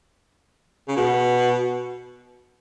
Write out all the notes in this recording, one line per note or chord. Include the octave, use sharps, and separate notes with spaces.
C#3
B2